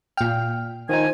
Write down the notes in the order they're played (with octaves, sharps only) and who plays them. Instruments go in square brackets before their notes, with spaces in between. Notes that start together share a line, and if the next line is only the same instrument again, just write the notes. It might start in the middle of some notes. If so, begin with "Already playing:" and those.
[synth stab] A#2 G5 [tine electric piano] F6
[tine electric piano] D#3 D#4 [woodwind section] F3 G#5